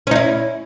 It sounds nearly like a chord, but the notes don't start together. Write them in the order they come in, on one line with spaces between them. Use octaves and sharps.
C#4 D#4 E4